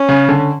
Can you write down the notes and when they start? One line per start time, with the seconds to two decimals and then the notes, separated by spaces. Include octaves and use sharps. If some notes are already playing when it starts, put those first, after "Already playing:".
Already playing: C#4
0.09 C#3
0.29 D3